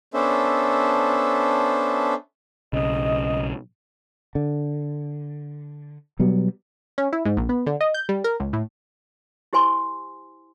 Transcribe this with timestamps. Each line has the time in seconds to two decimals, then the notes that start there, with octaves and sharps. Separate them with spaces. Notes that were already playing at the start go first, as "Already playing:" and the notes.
0.14 B3 C#4 D4 A4 C5 E5
2.73 B1 C#3 D#5
4.35 D3
6.19 B2 F#3 G3 B3
6.98 C#4
7.13 E4
7.25 G#2
7.37 A#1
7.49 B3
7.66 D3
7.81 D#5
7.94 G6
8.09 G3
8.24 A#4
8.40 C#2
8.53 A2
9.53 E4 G4 C5 G#5 C6